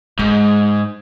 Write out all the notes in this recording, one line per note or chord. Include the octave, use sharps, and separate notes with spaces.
G#2 G#3